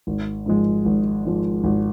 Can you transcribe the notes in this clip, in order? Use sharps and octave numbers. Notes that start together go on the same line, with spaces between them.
G#1
G#2 F3 G#3
G#1
G#2 F3 G#3
G#1